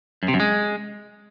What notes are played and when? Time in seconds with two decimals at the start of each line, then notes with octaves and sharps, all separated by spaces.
0.23 F#2
0.28 C3
0.34 F#2
0.40 G#3